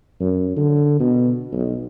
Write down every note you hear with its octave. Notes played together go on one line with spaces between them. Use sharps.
F#2
D3
B2
B1